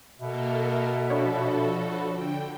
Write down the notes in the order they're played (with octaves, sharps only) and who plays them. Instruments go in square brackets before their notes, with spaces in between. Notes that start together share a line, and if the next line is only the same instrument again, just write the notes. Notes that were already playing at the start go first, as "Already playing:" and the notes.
[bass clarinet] B2 [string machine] A#3 A4 A#4 [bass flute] E5
[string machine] F3 F#4 A4 [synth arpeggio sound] D4 C#5 B5
[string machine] D3 G5